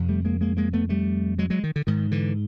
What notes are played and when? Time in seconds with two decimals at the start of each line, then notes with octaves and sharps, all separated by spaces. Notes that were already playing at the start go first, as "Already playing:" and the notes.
Already playing: F2 C3
0.09 G3 A3
0.25 G#3 A#3
0.41 G#3 A#3
0.57 G#3 A#3
0.73 A3 B3
0.89 G3 A3
1.39 F#3 G#3
1.50 F#3 G#3
1.64 D#3
1.76 D3
1.87 G#2 D#3
2.11 D3 E3